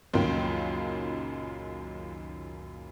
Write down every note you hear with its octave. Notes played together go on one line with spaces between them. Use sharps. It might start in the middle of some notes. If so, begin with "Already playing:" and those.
C#2 F#2 A#2 D#3 A#3 G5